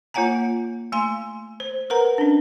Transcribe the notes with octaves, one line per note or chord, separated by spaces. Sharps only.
A#3 F4 C#5 F#5 G#5 A#5
A3 G#5 C6
C5
A#4 B4 F#5 A#5
C#4 D4